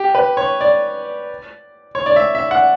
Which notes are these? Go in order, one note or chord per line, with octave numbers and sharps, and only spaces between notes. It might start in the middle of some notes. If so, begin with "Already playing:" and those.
Already playing: G4
B4
C#5
D5
C#5
D5
E5
E5
F#5